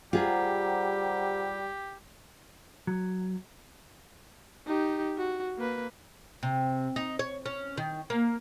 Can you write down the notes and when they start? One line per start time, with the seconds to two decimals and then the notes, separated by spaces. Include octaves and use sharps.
0.13 G3 F4 G4 G#4 C5 F#5 A#5
2.87 F#3
4.67 D#4 G4
5.17 F#4
5.58 A#3 B4
6.43 C3
6.96 D#4
7.19 C#5
7.46 C#4
7.77 D#3
8.10 A#3